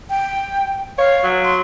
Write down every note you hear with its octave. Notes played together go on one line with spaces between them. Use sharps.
G5
C#5 F5
F#3
C6